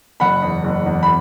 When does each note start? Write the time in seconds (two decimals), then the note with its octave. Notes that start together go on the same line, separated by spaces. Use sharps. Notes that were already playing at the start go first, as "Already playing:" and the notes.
0.20 F#1 F#5 B5
0.42 E2
0.64 F#1
0.86 E2
1.03 B5